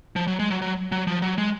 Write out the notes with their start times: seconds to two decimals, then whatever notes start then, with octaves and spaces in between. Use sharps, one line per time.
0.16 F3
0.27 F#3
0.39 G#3
0.50 F#3
0.62 F#3
0.92 F#3
1.07 F3
1.22 F#3
1.38 G#3